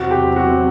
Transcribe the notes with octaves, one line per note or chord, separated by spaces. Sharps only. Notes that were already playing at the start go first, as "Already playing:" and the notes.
Already playing: E2 C3 F#3 C4 F#4
G4
F#4